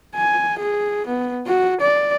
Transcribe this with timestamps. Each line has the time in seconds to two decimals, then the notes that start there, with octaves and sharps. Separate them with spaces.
0.16 G#5
0.59 G#4
1.07 B3
1.47 F#4
1.81 D5